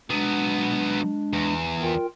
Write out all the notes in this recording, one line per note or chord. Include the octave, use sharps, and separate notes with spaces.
F#3 G#3 B3 D4
E2
F4 A#4 G5